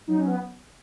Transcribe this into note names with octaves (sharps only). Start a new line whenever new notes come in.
F#3 D#4
C#4
B3